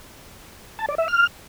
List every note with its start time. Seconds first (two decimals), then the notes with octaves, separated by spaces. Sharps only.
0.79 A5
0.89 D5
0.98 E5
1.08 F6